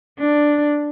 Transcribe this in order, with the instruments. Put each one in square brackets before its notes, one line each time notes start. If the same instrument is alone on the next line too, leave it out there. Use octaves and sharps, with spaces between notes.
[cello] D4